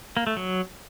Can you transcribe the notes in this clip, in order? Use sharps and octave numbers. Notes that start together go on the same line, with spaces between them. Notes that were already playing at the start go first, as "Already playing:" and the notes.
A#3
A3
F#3